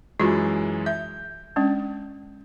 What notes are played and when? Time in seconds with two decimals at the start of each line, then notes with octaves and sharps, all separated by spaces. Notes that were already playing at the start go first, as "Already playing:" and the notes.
0.20 F#2 E3 G#3 F4 F#4
0.86 E5 G6
1.56 G#3 C#4 D4